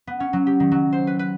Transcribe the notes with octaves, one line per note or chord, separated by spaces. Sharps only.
B3
C#4
F#3
G4
D#3
F#3
C5
B4
B4